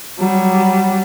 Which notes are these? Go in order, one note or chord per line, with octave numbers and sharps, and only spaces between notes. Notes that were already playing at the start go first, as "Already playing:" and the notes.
F#3 G3